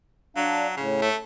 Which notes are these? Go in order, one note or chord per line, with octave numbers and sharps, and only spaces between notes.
F#3 D4 F5
A2 C#3
A3